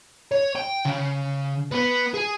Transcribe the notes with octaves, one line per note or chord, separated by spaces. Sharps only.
C#5
G5
C#3
B3 B4
G#4